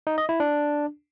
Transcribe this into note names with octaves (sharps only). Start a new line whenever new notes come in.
D#4
D#5
E4
D4